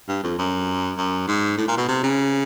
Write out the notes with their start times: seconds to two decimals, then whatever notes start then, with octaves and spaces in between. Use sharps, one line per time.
0.08 G2
0.23 F2
0.38 F#2
0.98 F#2
1.28 G#2
1.57 A2
1.68 A#2
1.77 B2
1.88 C3
2.03 C#3